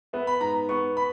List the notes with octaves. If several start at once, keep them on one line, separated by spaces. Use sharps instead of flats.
B3 E5
B5
G#2 A#5
B3 C#6
B5